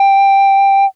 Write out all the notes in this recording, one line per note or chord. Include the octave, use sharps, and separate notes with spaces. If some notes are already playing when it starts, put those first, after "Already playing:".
Already playing: G5